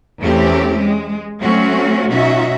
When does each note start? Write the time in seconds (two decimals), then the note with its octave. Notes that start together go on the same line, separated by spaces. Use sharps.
0.20 E2 E3 A3 C4 C#4 G4
0.80 G#3
1.40 F#3 A3 C4 C#4 F#4
2.09 B2 F#3 C#4 D#4 F#4 E5